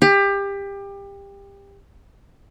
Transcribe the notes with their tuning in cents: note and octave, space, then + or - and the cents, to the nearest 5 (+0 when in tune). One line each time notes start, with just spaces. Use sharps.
G4 +25